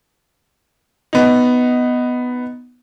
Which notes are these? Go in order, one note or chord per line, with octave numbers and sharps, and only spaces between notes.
B3 D#4